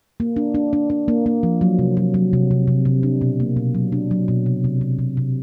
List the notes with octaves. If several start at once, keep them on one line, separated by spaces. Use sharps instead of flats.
A#3
D4
D4
D4
D4
A#3
A#3
F3
F#3
C3
F#3
F#3
C3
C3
C3
C3
D4
B2
A#3
B2
F#3
D4
F#3
B2
C3
C3
C3
C3
C3